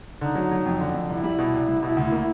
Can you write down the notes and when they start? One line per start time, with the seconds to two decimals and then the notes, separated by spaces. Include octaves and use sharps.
0.21 D3 D#4
0.35 F#3
0.51 F#3
0.66 F2
0.81 D3
0.94 F2
1.09 C2 E4
1.23 G3
1.39 B2
1.53 C2
1.68 C2
1.83 B2
1.97 D2
2.11 A#3